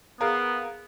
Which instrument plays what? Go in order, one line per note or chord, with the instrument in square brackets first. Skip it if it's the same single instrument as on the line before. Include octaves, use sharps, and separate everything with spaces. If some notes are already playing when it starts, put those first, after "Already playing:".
[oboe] B3 [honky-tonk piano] G#4 A#4 F5